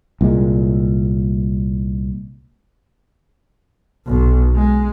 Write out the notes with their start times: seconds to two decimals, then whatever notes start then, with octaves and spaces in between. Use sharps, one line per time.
0.21 C2 A#2 G#3
4.07 B1
4.55 G#3